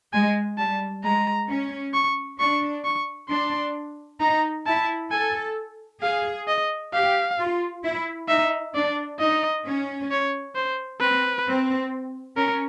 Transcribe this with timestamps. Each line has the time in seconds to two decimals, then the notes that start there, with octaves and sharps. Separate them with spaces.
0.13 G#3 G#5
0.58 G3 A5
1.03 G#3 A#5
1.49 C#4
1.94 C#6
2.39 D4 C#6
2.85 C#6
3.30 D4 C6
4.20 D#4 A#5
4.66 E4 A5
5.11 A4 G#5
6.02 G#4 F5
6.48 D#5
6.93 G4 F5
7.39 F4
7.84 E4
8.28 D#4 E5
8.75 D4 D5
9.20 D#4 D#5
9.66 C#4
10.11 C#5
10.55 C5
11.01 C4 B4
11.47 C4
12.37 C#4 A#4